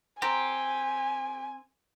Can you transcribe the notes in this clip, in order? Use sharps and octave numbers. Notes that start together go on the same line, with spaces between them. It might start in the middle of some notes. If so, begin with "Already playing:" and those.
C4 G4 G5 G#5 A#5